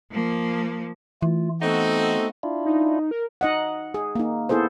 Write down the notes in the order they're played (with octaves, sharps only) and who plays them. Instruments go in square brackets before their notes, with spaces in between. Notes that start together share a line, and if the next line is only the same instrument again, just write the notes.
[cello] F3 A#3
[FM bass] E3 [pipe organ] A3 F4
[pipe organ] A3 B3 [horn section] C4 D#4 F#4 [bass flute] A4
[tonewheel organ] D4 E4 F4
[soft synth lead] D#4
A#4
[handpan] D#4 D#5 F#5
G#4
A#3 D#4
B3 E4 G#4 A4 C5